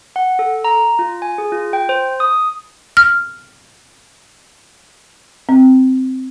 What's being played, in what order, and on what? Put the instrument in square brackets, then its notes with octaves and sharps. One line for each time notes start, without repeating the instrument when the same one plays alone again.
[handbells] F#5
A4
A#5
F4
G#5
G#4
F4
G5
C5
D#6
[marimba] F6
[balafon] C4